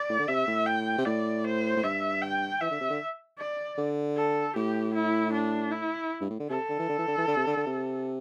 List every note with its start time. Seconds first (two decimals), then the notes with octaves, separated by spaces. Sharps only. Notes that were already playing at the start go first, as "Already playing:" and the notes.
Already playing: D5
0.09 A2
0.19 D3
0.28 C3 E5
0.47 A2
0.67 G5
0.98 C3
1.06 A2 D5
1.44 C5
1.76 A2
1.84 G2 E5
2.22 G5
2.61 E3 E5
2.71 D3
2.81 C3
2.90 D3
3.39 D5
3.77 D3
4.17 A4
4.56 A2 G4
4.95 E4
5.33 D4
5.72 E4
6.21 G2
6.30 A2
6.40 D3
6.50 C3 A4
6.69 D3
6.79 E3
6.89 D3
6.98 E3
7.08 D3
7.18 E3
7.28 D3
7.37 C3
7.47 D3
7.57 D3
7.67 C3